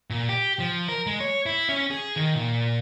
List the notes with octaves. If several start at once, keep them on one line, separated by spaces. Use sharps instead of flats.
A#2
G4
F3
A#4
G#3
C#5
E4
C#4
G#4
D#3
A#2